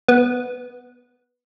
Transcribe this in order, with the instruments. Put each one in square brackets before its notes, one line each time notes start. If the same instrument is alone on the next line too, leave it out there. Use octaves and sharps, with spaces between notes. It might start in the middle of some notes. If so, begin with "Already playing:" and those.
[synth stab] B3